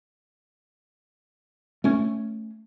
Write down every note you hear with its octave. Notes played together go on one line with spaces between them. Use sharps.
A3 C#4